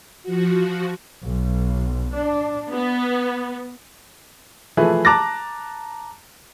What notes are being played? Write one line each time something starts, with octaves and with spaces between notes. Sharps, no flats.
F3 F#4
B1
D4
B3
E3 F3 A3 E4 G#4 B4
A5 A#5 D6 F#6 A6 A#6